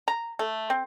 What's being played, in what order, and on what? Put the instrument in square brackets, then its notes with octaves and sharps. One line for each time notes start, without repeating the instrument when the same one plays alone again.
[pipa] A#5
A3
C4